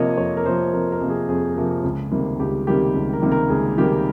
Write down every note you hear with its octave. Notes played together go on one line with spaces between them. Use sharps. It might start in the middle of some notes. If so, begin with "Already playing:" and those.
Already playing: C3 F3 A#3 C#5 D#5
F2 C#5
A#4
C3 F3 A#3 C5
F2 A#4
A#4
C3 F3 A#3
G#4
F2 G#4
C3 F3 A#3
C#2
C3 D#3 G3 A#3
C#2 G4
C3 D#3 G3 A#3 G4
C#2
A#4
C3 D#3 G3 A#3
A#4
C#2 G#4
C3 D#3 G3 A#3 G4